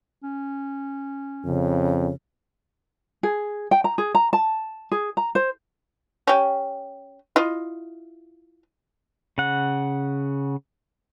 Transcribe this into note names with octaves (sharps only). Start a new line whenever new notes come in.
C#4
F2 C#3
G#4
G5
A#5
G#4
A#5
A5
G#4
A#5
C5
C#4 G4
E4 F4 D#5
C#3 F#5